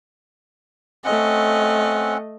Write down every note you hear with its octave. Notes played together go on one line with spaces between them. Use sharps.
A3 C4 C#4 D#5 F#5